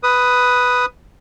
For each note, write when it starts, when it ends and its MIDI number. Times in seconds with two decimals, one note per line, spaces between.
0.03 0.86 71
0.03 0.86 87